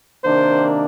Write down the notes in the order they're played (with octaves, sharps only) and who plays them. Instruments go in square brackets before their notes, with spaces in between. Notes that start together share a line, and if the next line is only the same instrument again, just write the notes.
[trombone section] C3 D#3 A#3 D4 [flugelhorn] C5